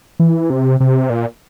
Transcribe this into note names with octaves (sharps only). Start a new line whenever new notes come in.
E3
C3
C3
A#2